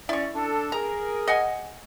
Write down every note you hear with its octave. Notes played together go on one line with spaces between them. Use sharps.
C#4 E4 D5 C#6
D4 A4
G#4 A#4 A#5
D#5 F#5 G#5